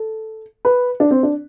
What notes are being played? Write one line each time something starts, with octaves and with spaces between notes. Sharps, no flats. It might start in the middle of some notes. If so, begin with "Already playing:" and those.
Already playing: A4
B4
D4
C4
D4